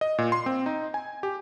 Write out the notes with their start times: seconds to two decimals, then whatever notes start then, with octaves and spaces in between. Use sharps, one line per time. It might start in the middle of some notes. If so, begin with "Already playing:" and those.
0.01 D#5
0.18 A#2
0.32 C6
0.46 C4
0.66 D#4
0.94 G#5
1.23 G4